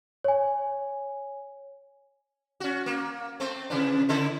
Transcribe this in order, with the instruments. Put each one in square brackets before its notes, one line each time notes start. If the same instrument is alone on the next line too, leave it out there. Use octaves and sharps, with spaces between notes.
[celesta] C#5 G#5
[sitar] C#4 F#4
A#3
A3 C4
C3 E3 D4
C#3 E4 A4